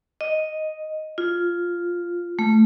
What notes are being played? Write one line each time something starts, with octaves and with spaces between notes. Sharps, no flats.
D#5
F4
A3